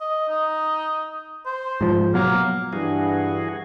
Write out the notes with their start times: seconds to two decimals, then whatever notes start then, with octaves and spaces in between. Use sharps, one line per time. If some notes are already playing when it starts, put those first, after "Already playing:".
0.01 D#5
0.29 D#4
1.46 C5
1.81 G#2 F3
2.14 B2 F#3 A#3
2.73 G2 E3 F#4 G#4